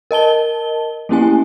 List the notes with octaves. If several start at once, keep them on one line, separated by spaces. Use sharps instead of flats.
A#4 D#5 A5 G7
A3 A#3 C#4 E4 G4 G#5